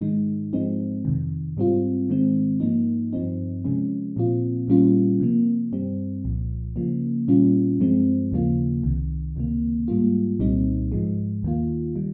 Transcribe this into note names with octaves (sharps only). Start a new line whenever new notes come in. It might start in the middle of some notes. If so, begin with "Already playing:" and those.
G#2 D#3 G#3 D#4
G#2 F3 G#3 C4 D#4
F2 C3 D#3
G#2 G3 C4 F4
G#2 D#3 G#3 C4
G#2 F3 A#3 D#4
G2 F3 C4 D#4
C3 F3 G#3 C#4
A#2 F3 C4 F4
A#2 G3 C#4 F4
C3 F3 A#3
G2 G3 C4
C2 A#2 F3
C#3 F3 A#3
A#2 G3 C#4 F4
G2 F3 G#3 C4
D#2 C#3 F3 A#3 F4
C2 C3 D#3
C#2 C3 D#3 A#3
G#2 G3 A#3 F4
C2 A#2 G3 C4 D#4
G#2 F3 G#3
D#2 D#3 A#3 F4
D#3 G3